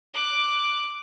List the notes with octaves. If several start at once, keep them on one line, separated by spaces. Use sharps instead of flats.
D6 F#6